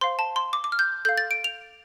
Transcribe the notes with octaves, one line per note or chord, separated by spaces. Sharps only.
C5 F5 C6
A5
C6
D6
D6
F6
G6
A4 F5 G6
A6
D7
F7